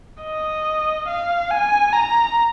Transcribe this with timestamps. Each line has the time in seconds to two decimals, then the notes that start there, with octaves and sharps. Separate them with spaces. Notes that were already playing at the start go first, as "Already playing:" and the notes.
0.23 D#5
1.08 F5
1.50 G#5
1.93 A#5